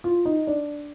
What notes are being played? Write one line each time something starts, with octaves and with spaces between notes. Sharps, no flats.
F4
D#4
D4